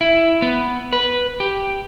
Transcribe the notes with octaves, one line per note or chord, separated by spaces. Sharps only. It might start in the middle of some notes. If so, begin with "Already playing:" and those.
E4
B3
B4
G4